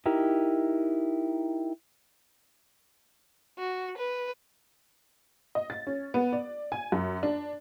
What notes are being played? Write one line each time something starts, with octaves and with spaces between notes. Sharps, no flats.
D#4 E4 G4 A#4
F#4
B4
D#5
A6
C#4
B3
D5
G#5
F#2
D4